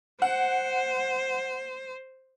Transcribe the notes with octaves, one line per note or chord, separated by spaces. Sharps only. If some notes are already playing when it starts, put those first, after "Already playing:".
C5 F#5